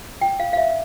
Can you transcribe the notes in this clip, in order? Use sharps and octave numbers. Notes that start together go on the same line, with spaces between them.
G5
F5
F5
E5